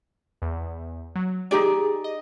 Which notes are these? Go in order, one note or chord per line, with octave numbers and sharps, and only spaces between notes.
E2
F#3
D#4 G4 G#4 D5
D#5